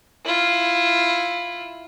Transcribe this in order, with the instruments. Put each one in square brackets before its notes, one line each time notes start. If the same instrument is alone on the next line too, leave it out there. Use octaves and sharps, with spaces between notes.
[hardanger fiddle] E4 F4